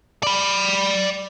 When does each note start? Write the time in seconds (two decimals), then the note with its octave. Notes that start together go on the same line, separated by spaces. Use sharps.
0.23 D5 B5